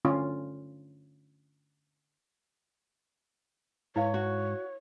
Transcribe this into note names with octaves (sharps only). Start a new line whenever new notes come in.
D3 C#4 F4
G#2 E4 B4 C#5 F5
F#4